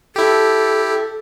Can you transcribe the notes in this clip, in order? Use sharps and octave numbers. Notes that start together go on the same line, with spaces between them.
E4 G4 A4